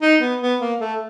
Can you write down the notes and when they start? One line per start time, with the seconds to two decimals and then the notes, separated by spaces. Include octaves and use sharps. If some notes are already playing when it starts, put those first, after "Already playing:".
0.02 D#4
0.21 B3
0.41 B3
0.60 A#3
0.80 A3